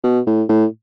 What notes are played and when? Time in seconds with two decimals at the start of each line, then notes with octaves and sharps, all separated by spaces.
0.04 B2
0.27 A2
0.49 A2